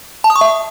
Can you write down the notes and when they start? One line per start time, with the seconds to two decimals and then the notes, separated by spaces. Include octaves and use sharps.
0.24 A5
0.30 D#6
0.36 C#6
0.41 E5